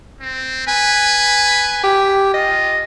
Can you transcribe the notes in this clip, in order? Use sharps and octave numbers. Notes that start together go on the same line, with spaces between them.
C4
B4 G#5
G4
F4 D#5